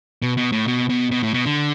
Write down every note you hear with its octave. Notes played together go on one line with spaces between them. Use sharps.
B2
B2
A2
B2
B2
B2
A2
B2
D3